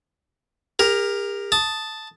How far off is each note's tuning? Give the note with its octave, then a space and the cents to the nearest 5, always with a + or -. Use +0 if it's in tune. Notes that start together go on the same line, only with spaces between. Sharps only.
G4 +45 A#4 +0
A5 +0 D#6 +0